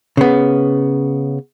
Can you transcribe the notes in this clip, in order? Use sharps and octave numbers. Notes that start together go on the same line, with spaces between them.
C#3 B3